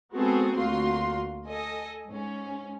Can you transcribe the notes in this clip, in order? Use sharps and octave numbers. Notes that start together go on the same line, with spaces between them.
G#3 B3 C4 F#4 G#4 A4
D2 A#3 F4 F#4 C6
A4 D#5 G#5
G#2 C#4